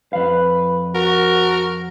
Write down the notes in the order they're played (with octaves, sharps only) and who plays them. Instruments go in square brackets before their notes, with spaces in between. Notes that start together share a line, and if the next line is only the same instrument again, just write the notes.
[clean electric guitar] F2 F5 [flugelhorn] B4
[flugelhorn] F#4 [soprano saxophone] A#4